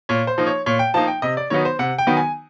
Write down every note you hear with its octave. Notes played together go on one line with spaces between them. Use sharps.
A#2 C#5
C5
F3 A#3 D#4
C#5
A#2 C#5
G5
F3 A#3 D#4 A5
G5
C3 D#5
D5
D#3 F#3 B3 D#4 C#5
C5
C3 F#5
G5
D#3 F#3 B3 D#4
G#5